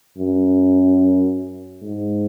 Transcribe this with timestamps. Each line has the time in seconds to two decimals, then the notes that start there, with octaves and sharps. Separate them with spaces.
0.17 F#2
1.82 G#2